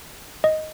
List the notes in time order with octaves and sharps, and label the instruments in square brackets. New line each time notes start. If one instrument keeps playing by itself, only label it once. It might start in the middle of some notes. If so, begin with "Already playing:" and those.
[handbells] D#5